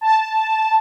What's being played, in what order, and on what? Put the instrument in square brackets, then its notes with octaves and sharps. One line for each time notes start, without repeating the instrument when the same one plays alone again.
[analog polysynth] A5